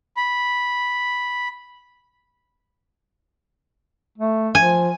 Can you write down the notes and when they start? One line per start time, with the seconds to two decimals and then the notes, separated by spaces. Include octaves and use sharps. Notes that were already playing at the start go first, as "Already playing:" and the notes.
0.17 B5
4.18 A3
4.55 F3 G#5